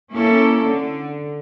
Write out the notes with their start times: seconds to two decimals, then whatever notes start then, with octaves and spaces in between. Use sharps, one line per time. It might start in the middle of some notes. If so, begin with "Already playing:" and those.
0.11 A#3 C#4 E4 A4
0.64 D3